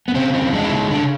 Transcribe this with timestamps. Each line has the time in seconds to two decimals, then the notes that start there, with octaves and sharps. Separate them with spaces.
0.08 B3
0.14 C#3 C4
0.34 E3 C4
0.53 G#3 D4
0.64 E4
0.71 C#3 D#4
0.90 C#3 D4